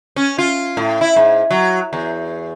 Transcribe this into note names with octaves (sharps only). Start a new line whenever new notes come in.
C#4
F4
A2
E4
G#2
F#3
E2